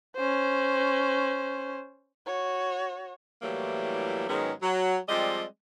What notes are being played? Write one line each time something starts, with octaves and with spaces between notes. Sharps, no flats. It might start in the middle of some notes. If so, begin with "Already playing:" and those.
C#4 C5
F#4 C#5
A2 E3 F#3 G3 A3 A#3
G#2 D#3 F#3 G#3 B3 C#4
F#3
F3 G3 G#3 C4 D5 D#5